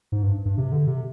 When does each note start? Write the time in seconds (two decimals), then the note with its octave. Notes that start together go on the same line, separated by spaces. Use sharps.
0.12 G#2
0.23 G2
0.45 G2
0.57 C3
0.72 D3
0.87 C3